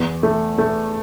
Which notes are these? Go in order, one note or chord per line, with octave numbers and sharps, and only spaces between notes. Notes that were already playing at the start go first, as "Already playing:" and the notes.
Already playing: E2
A3
A3